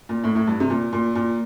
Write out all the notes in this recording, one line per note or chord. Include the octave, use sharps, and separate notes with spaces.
A#2
A2
A2
G2
C3
A#2
A#2
A#2